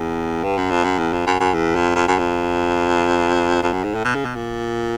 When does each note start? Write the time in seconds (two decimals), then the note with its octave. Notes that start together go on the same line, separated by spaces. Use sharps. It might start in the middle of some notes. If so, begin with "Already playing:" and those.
Already playing: E2
0.44 G2
0.58 F#2
0.71 F2
0.84 F#2
0.99 E2
1.13 F2
1.26 F#2
1.40 F#2
1.54 E2
1.75 F2
1.95 F2
2.08 F#2
2.18 F2
3.63 F2
3.73 F#2
3.84 G#2
3.95 A2
4.05 B2
4.15 C#3
4.25 B2
4.35 A#2